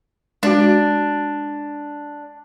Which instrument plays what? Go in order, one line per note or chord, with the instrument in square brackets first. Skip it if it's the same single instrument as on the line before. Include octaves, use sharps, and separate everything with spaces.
[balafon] G#3 F#4 [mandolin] D4